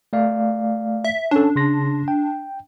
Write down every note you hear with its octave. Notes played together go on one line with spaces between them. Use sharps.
A3 D5 F5
E5
C#4 D4 A4
C#3 C6 A#6
G5